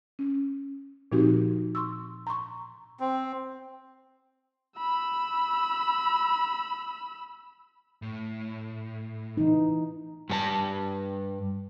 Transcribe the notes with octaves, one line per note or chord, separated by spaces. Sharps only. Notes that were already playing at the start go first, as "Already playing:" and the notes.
C#4
A#2 F3 C4 D#4 F#4 G4
C6 C#6 E6
A#5 C6 C#6
C4
B5 E6
A2
E3 D#4
G2 G4 A5